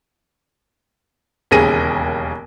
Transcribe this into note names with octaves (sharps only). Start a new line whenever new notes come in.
E1 D#2 C#3 G#4 A#6 D#7